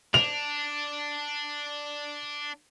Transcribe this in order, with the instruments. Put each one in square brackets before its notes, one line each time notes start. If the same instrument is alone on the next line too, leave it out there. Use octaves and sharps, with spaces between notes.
[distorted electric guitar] D4 [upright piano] F7